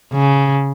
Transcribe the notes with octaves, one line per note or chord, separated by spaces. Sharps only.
C#3